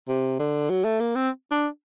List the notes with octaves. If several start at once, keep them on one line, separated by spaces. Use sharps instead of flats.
C3
D3
F#3
A3
A#3
C4
D4